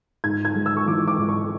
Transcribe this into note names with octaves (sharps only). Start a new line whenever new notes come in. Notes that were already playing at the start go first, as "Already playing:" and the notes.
G#2 G#6
G#6
G#3
E6
C#6
E3 D6
D6
G#2
C#6